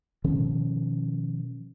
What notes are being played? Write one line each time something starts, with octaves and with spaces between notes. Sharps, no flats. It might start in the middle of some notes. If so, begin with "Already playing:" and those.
B2 D#3 F3 C#4